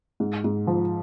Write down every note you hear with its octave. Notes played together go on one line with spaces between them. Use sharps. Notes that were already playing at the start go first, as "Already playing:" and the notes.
G#2
G#2
F3